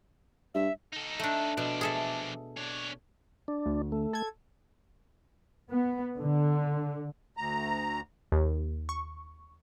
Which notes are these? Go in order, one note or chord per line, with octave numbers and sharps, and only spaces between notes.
G2 E5
D#4 A4
A3 D4
B2 F3 D4
G#4 A4 E5
D4 C#5
D4
D2
A3
A4 G#6
B3
D3
D2 A#5
D#2
C#6